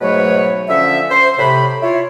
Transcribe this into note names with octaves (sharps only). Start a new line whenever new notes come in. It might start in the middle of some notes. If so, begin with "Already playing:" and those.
G#2 B2 F#3 A3 B4 C#5
D3 F3 C#4 E5
C5
A2 C3 B5
E4 F4 C#5